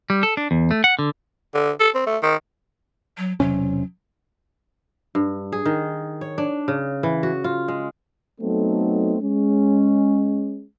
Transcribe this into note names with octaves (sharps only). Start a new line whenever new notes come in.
G3
A4
D4
E2
A3
F#5
D3
D3
A4
C4
A3
D#3
F#3
E1 C3 F#3 C#4
G2
G#4
D#3
C#5
D4
C#3
E3
F#4
F4
G#3
F#3 A3 B3 C4 D#4 A4
G#3 C#4